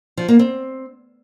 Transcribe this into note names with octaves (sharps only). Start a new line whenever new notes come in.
F3
A#3
C4